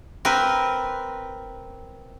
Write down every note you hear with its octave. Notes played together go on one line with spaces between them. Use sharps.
C4 A#4 B4